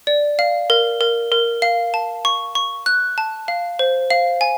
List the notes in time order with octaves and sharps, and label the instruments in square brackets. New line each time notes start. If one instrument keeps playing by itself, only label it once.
[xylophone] D5
F5
A#4
A#4
A#4
F5
A5
C#6
C#6
F#6
A5
F5
C5
F5
G#5